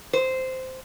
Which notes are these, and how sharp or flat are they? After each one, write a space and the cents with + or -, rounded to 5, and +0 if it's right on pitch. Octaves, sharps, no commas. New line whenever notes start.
C5 -10